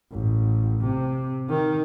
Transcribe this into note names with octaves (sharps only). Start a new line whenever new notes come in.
A1
C3
D#3